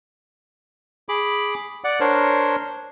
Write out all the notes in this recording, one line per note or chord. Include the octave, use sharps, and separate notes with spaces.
G#4 B5 D6
D5 F#5
D4 A#4 C5 C#5